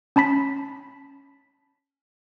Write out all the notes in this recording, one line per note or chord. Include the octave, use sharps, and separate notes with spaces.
C#4 A5 B5 B6